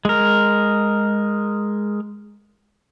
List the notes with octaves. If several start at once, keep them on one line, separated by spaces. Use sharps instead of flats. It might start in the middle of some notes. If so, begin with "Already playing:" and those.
G#3 A#4